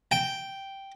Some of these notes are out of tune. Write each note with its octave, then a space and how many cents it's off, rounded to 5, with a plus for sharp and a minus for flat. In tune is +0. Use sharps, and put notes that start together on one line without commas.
G5 -5